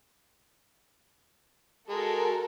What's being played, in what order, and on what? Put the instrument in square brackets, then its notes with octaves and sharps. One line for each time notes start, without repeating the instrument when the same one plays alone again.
[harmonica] G#3 [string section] F#4 A4 A#4